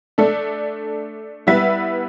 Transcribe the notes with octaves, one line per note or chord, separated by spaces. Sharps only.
A3 D4 A4 D5
G3 B3 E4 B4 E5